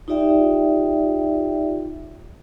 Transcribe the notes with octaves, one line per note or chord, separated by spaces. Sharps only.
D#4 F4 G4 D5 E5 G5